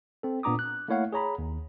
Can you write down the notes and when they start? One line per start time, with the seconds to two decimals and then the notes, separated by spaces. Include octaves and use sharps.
0.23 C4 A4
0.43 A#2 B3 D4 A#5 D6 D#6
0.59 F#6
0.88 A3 A#3 E4 C#5 F5 F#5
1.13 G#4 C#5 A#5 B5
1.38 D#2